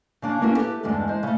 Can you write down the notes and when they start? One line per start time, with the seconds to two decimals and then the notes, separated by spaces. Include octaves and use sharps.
0.22 C#3 A#3 D4
0.41 A#3 B3 C#4 E4 F#4 A#4
0.55 G4 A4 B4
0.83 E2 G2 D3 G#3 A3 D4
1.08 G#3 C5
1.23 C#3 A3